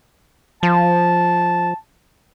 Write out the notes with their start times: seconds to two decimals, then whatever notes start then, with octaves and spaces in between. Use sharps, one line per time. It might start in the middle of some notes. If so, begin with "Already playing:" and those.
0.63 F3 A5